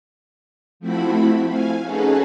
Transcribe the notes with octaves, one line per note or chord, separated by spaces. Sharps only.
F3 A3 C4 E4 F#4 B5
F5 G#5
C#4 D#4 F#4 G#4 A4 B4